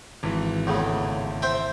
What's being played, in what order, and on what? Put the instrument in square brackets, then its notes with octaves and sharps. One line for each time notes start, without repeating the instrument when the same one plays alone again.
[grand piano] G#1 E3
[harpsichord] E2 A2 C#3
C5 E5 G5